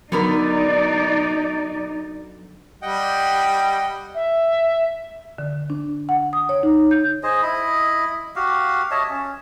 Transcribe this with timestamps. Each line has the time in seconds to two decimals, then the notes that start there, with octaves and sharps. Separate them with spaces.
0.12 D3 F#3 B3 D#4 A#4 D5
2.82 G3 D#5 F#5 G5
4.15 E5
5.38 D3
5.70 D4
6.09 F#5
6.33 D#6
6.49 C#5
6.63 D#4
6.91 G6
7.23 G#4 C5 D#5
7.42 E4 D#5 B5
8.36 F#4 G4 F5
8.91 C#5 D#5 E5 A5
9.10 C#4